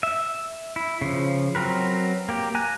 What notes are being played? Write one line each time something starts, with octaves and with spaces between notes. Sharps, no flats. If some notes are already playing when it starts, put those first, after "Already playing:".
E5
E4
C#3 F3
F#3 C4 A#4 B4
A#3 G4
G#5 A#5 F#6